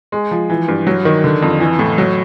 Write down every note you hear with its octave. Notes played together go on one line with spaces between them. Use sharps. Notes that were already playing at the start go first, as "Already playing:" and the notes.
G#3
F3
E3
G2
F#3
D#3
D3
F2
E3
A2
F#3